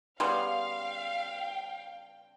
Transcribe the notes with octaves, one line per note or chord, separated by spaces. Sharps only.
C#3 G3 B3 F5 G5 C6